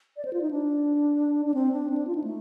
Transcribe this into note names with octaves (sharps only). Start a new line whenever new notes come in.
D5
C5
F4
D#4
D4
D4
C4
D4
C4
D4
F4
D#4
A3